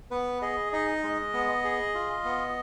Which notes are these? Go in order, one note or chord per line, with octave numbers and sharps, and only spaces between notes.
B3 B4
G#4 D#5
D#4 D#5
G#3
B3
G#4
F4
B3